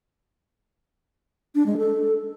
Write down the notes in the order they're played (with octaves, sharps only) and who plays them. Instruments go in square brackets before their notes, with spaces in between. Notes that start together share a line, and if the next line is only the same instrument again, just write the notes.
[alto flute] D4
G#3
A4